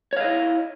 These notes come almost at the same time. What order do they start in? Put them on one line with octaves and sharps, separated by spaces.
C#5 F5 D#5 E4